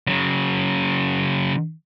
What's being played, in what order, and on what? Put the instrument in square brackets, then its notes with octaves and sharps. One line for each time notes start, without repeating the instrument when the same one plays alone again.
[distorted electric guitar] C#3 F#3